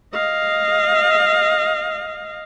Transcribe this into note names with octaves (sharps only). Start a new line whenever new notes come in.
D#5 F5